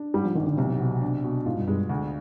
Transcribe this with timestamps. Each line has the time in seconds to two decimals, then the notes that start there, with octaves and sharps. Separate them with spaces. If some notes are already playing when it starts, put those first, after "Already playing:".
Already playing: D4
0.14 G#2 G3
0.24 F3
0.35 G#1 D#3
0.47 D3
0.57 B1 C3
0.80 B2
1.01 D4
1.24 B2
1.46 G#2 F4
1.57 G2
1.67 G2 G#3
1.89 D2